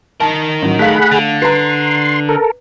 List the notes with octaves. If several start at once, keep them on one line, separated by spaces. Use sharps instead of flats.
D#3 A#4 A5
A1 F#3
A3 G#4 F5 F#5 B5
D3
B4 A#5 C6
A4 A#4